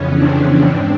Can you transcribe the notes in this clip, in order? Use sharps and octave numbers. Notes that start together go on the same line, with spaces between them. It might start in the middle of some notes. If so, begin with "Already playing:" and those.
Already playing: F2 C#3 E3 B3 C#4
C4 D4
G#2